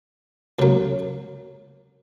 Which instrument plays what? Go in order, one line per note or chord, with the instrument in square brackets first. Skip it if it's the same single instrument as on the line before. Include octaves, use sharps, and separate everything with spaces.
[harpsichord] C#2 C#3 F#3 A#3